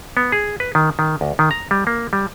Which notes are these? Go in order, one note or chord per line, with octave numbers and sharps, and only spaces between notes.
B3
G#4
B4
D#3
D#3
D2
D#3
A#5
G3
A#3
G3